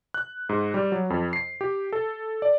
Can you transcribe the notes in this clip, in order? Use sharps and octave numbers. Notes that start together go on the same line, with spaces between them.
F#6
G#2
G3
F#3
F2
C7
G4
A4
D5